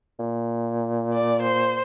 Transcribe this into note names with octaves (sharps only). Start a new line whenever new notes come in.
A#2
D5
C5